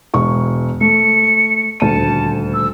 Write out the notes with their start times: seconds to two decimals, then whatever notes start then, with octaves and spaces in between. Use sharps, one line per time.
0.14 E1 C#6
0.81 A3 C#7
1.80 D#1 D2 A5 D#7
2.54 E6